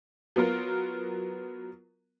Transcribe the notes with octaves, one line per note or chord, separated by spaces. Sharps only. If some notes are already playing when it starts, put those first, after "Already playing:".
F#3 B3 F4 A#4